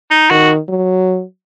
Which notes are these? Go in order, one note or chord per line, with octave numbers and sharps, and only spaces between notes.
D#4
D#3 F#4
F#3